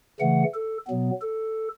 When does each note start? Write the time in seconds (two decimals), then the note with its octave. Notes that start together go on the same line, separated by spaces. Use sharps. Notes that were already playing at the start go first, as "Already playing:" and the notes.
0.20 C#3 E3 A3 F#5
0.54 A4
0.87 B2 F#3 B3
1.21 A4